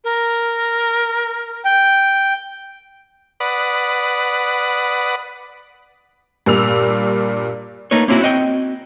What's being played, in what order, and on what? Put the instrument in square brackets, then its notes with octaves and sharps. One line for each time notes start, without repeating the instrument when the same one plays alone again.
[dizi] A#4
[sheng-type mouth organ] G5
[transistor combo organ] B4 D5 F#5 B5 D#6
[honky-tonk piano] G2 A#2 D5 E6 F7
[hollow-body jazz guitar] A3 A#3 D#4 B4 C#5
A#3 C4 C#4 E4 F#4
C4 F#4 D#5 G5